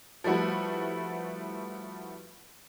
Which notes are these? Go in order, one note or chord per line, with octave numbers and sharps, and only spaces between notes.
F3 G3 A3 E4 F#4 B4